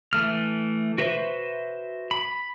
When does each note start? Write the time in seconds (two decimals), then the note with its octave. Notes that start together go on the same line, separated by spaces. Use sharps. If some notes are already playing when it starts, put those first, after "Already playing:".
0.13 E3 A3 F6
0.98 F#4 B4 C5 E5
2.11 B5